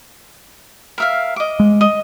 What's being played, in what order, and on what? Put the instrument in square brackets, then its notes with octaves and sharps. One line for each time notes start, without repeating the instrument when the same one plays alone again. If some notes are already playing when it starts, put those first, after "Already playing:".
[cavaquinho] A#4 E5 F5
D#5 D6
[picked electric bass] G#3
[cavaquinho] D#5